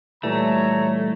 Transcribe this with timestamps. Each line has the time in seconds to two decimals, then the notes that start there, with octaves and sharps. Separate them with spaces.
0.23 A#2 E3 G3 A3 C#5 A#5